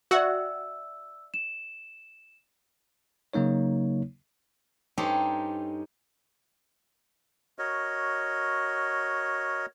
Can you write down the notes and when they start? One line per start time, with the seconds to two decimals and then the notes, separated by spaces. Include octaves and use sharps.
0.11 F#4 D5 E5 F#5 G5 E6
1.34 E7
3.34 C#3 F#3 A#3 D#4 C#5
4.98 G2 C#4 D#4 G4 A4 C5
7.59 F#4 A#4 C#5 D#5